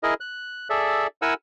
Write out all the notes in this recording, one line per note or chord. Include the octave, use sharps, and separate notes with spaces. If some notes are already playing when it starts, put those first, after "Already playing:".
E4 G#4 A#4 D#5
F#6
G#4 A4 D5 E5
E4 A#4 F#5 G#5 E6